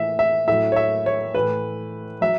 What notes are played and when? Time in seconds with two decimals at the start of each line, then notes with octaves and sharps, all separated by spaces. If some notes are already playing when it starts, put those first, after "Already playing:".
Already playing: A2 E3 E5
0.19 E5
0.48 A2 F#3 E5
0.72 C#5
0.76 E5
1.06 C#5
1.35 A2 E3 B4
2.21 F#3 E5